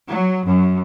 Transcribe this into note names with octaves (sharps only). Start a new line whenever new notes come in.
F#3
F#2